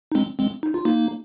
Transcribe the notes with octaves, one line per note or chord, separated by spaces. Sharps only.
D#4
G#3 C4
G#3 C4
D#4
F4
A#3 D#4